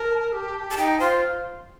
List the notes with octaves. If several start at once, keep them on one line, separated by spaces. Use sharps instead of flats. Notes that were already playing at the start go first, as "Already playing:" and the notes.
Already playing: A#4 A5
G4
A5
D#4 G5
F4 C5